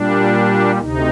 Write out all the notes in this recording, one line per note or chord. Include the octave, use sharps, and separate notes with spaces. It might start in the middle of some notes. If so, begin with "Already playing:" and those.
Already playing: A#2 G3 D4
D2 C3 D#4